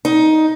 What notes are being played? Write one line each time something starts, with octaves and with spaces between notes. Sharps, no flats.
D#4